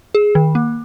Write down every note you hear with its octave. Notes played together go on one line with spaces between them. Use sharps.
G#4
D#3
A#3